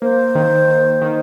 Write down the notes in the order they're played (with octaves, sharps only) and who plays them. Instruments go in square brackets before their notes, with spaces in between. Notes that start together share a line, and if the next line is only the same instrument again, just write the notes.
[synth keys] A#3 [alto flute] C5
[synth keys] D#3
D#3
D#3